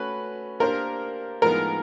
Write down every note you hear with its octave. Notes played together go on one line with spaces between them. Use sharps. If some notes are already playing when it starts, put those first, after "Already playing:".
Already playing: A3 C#4 F#4 B4
A#3 D4 G4 A#4 C5
A2 F3 G#3 B3 D#4 A#4